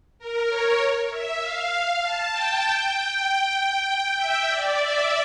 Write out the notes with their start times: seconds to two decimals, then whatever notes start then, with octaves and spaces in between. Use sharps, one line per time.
0.19 A#4
0.48 C#5
1.10 E5
1.41 F5
2.03 A5
2.33 G5
2.94 G5
3.25 G5
3.55 G5
4.17 E5
4.48 D5
4.79 E5